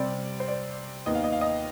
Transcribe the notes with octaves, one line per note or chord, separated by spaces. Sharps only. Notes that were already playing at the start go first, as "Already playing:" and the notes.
Already playing: C3 G3 C4 D5
C5
D5
D#2 D#3 B3 D#5
F5
D#5
F5
D#5